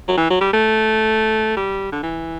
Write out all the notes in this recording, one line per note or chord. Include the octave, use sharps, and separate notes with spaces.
F#3
E3
F#3
G3
A3
G3
D3
E3